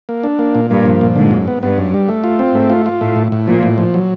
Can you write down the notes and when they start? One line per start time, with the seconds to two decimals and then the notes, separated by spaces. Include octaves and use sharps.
0.09 A#3
0.24 D4
0.39 A#3
0.55 A#2
0.70 G2 A#3
0.86 F3
1.01 A#2
1.16 G#2 D3
1.31 F#2
1.48 B3
1.63 G2 B3
1.78 F#2
1.94 G3
2.09 A3
2.24 F4
2.39 C4
2.54 G#2 A3
2.70 F4
2.86 F4
3.01 A2 A3
3.16 A2
3.32 A2
3.47 A#2 F3
3.63 A2
3.78 F3
3.94 F#3